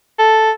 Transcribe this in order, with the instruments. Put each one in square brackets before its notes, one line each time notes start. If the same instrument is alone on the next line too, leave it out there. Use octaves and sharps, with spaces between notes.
[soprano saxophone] A4